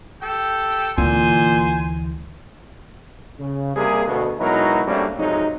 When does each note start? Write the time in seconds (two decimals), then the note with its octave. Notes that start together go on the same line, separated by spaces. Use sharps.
0.22 G4 A4 G5
0.98 D2 A#2 E3 C5 G#5
3.39 C#3
3.76 C3 G3 A#3 G#4
4.07 D2 B2 A3
4.40 B2 F#3 G#3 D#4 E4 A#4
4.87 F#2 G3 A3 A#3 C4 D4
5.19 F2 G#2 C3 F#3 D#4